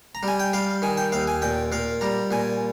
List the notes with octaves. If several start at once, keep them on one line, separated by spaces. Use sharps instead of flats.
A#5
G3 G#5
G5
G3 F5
D#3 G#5
G5
D#2 F5
G#5
A#2 G5
A#2 F5
G3 A#5
A#2 G#5